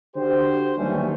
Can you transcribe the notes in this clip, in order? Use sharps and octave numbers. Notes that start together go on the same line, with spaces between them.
D3 F#4 G4 C5
D#2 E3 F#3 G3 A3 C#4